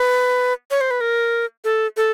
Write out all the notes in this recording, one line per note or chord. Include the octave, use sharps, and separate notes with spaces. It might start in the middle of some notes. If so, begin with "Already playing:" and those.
Already playing: B4
C#5
C5
B4
A#4
A4
A4